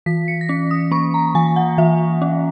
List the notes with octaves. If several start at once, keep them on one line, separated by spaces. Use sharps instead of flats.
E3 B6
C#7
A#6
C#4 B6
D#6
A#3 C#6
A#5
E3 G#5
F#5
E3 E5
C#4